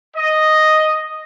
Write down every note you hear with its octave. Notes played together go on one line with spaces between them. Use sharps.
D#5